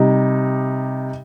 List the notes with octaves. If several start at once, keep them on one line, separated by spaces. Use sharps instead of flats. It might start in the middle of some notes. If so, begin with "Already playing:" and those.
Already playing: C3 G3 D#4